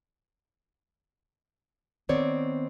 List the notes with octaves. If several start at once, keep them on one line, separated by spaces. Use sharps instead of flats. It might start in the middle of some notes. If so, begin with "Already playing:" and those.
D#3 B3 C4 C#5 D5